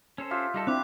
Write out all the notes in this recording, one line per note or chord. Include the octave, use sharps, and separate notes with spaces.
C#4 A4 C5
F4 G4 E5
G3 D#4 A4
B3 C4 D4 E4 B4 D6 F#6